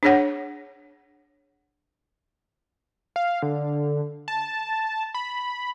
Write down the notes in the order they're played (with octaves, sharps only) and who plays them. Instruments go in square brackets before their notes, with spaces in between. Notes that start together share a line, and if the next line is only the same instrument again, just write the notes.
[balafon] D4 G#4 C#5 F#5
[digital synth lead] F5
D3
A5
B5